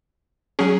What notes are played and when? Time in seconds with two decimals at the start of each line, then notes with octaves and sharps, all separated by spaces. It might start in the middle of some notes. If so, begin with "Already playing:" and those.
0.59 F#3 C#4 G#4